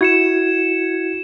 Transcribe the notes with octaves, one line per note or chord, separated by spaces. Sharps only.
E4 F#4 G#6 C#7 E7